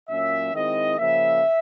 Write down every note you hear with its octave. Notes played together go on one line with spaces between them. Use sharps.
A#2 F#3 A#3 C#4 E5
D#3 G#3 C4 E4 D#5
C#3 F3 A#3 E5